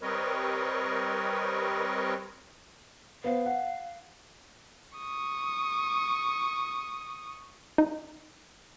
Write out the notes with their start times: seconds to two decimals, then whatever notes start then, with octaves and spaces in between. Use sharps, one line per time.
0.01 G3 C4 A#4 B4 C#5 D#5
3.24 B3 C5 F5
3.46 F#5
4.98 C#6 D#6
7.78 D#4